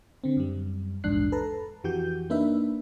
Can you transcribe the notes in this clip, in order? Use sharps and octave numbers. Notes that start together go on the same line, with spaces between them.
D3 C4
F#2 G3
A#1 E2 G#2 D4 F#6 C7
A4 B4 A5 A#5
F2 E3 F#4 G4 G6
A#3 D4 D#4 B4 E5